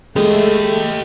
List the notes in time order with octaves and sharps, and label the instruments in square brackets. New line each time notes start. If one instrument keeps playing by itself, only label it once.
[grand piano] G#3 [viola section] A3 [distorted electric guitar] G4 D#5